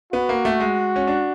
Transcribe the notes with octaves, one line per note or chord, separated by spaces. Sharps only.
B3 F#4
A#3
A3
G#3
C#4
D4